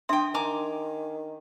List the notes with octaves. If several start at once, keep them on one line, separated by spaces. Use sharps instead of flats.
D4 E5 G5 C6 D#6
D#3 G#5 A#5 D6